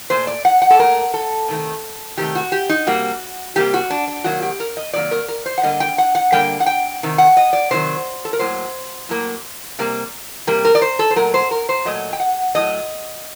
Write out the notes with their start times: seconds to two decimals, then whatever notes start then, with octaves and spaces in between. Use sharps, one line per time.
0.10 A#2 A3 C5
0.27 D5
0.45 F#5
0.62 F#5
0.70 A4
0.79 A#2 A3 A#4
1.14 A4
1.48 C3 D#3 A3
2.17 C3 D#3 A3 G4
2.35 F#4
2.52 G4
2.69 D#4
2.87 C3 G3 A#3 F#4
3.56 C3 G3 A#3 G4
3.74 F#4
3.90 D4
4.08 D4
4.24 C3 D#3 F#3 A#3 F#4
4.42 G4
4.60 A#4
4.77 D#5
4.93 C3 D#3 F#3 A#3 D5
5.11 A#4
5.28 A#4
5.46 C5
5.58 F#5
5.63 D3 G3 A#3 D#5
5.80 G5
5.98 F#5
6.15 F#5
6.32 D3 G3 A#3 G5
6.60 F#5
6.66 G5
7.03 C3 D#3
7.18 F#5
7.37 D#5
7.53 D5
7.71 C3 D#3 F#3 C5
8.25 A4
8.33 A#4
8.39 A2 F#3 A#3 C5
9.09 A2 F#3 A#3
9.79 C3 G3 A#3
10.47 C3 G3 A#3 A#4
10.65 A#4
10.75 D5
10.82 C5
10.99 A4
11.10 C5
11.16 A#2 F#3 A3 A#4
11.34 C5
11.51 A#4
11.69 C5
11.85 A#2 F#3 A3 D#5
12.13 G5
12.20 F#5
12.55 A2 F#3 A3 D#5